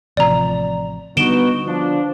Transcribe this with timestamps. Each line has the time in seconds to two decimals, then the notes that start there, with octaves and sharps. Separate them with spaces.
0.17 A1 C3 F3 D5 A#5
1.17 D3 G3 B3 D#4 F#4 D7 E7 G7
1.67 F3 D4